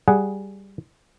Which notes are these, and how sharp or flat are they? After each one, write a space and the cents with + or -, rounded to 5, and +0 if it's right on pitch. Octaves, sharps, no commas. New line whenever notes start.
G3 +0 G#4 +0 F#5 +0